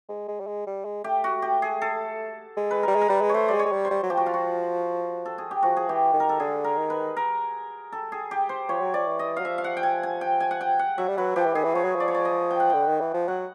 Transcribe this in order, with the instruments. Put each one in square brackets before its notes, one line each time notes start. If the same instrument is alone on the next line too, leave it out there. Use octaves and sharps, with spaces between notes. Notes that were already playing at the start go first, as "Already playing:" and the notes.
[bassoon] G#3
G#3
G3
G#3
G3
G#3
[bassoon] A3 [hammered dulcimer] G4
[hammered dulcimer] F#4
G4
G#4
A4
[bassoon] G#3
[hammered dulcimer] B4
[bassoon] G3 [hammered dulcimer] A#4
[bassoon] G#3
[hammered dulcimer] A#4
[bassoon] G3 [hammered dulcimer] B4
[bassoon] G#3
[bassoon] A3 [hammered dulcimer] C5 C#5
[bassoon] G3 [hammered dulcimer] D5
[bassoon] G#3
[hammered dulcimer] C#5
[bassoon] G#3
G3
[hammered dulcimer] C5
[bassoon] G3
F#3
[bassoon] F3 [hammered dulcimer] G4
[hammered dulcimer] F#4
F4
F#4
A4
G#4
G4
[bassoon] F3 [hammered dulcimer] F#4
[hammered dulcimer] G#4
[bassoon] E3 [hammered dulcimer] G4
[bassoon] D#3
[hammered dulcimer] A#4
A4
[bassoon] D3 [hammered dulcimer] G#4
[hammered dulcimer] A#4
[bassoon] D#3
[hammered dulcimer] B4
A#4
A4
G#4
G4
C5
[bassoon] F3 [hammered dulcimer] C#5
[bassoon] F#3
[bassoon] F3 [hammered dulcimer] D5
[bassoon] E3
[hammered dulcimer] D#5
[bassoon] F#3 [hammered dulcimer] F5
[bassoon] F3 [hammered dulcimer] E5
[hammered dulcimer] F5
F#5
G5
G#5
G#5
G5
G#5
F#5
G5
F#5
[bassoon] F#3 [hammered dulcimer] E5
[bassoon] G3
[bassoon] F#3 [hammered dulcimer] B4
[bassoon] F3 [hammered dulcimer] G4
[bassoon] E3
[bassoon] D#3 [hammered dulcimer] G#4
[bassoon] E3
[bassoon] F3 [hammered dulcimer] C#5
[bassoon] F#3
[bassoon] F3 [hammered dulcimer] D5
[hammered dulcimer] C#5
D5
D#5
G5
F#5
[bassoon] D3 [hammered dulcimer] G5
[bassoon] D#3
E3
F3
[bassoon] F#3 [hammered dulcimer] F#5